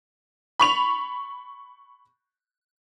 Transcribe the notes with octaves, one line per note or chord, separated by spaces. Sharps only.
B5 C#6 F7